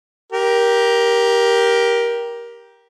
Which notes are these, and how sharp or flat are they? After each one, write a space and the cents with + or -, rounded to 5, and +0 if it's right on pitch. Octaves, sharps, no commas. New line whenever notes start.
G4 +0 A#4 +15